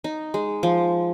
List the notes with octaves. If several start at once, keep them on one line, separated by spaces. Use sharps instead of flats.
D#4
G#3
F3